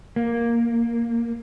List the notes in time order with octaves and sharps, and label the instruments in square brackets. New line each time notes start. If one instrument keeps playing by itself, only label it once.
[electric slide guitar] A#3